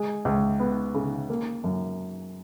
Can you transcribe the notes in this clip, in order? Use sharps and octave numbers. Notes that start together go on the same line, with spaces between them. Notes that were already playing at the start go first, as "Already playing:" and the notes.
Already playing: G#3
C#2
B3
C#3
A#3
F#2